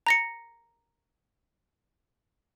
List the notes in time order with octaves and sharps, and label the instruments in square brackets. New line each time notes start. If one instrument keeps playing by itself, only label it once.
[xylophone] A#5 A#6 C#7